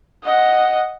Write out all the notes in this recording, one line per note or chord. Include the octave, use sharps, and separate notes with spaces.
D#5 F#5